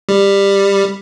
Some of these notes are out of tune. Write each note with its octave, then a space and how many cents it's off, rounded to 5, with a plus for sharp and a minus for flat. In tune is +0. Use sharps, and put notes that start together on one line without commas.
G3 +15